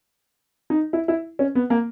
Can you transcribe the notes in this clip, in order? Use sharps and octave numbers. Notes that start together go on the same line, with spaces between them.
D#4
E4
E4
C#4
B3
A#3